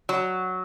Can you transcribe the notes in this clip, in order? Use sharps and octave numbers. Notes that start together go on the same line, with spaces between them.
F#3